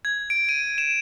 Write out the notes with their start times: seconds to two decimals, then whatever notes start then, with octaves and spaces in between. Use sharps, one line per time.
0.05 G#6
0.30 D7
0.49 D#7
0.78 E7